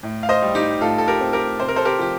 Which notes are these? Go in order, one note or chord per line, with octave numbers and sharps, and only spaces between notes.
A2
F5
C5 D#5
G3
D#4 G4
A2 F4 A4
A4
G4 A#4
C4
G4 A#4
C3 C5
A#4
A4 C5
G4 A#4
F3 G4